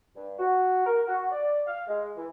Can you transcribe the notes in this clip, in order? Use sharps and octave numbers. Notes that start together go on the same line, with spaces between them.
G2
F#4
A#4
F#4
D5
F5
G#3
E3